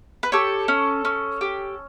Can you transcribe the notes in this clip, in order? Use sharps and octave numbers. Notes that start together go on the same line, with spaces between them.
B4
G4 A4 C#5
C#4
C#4
G4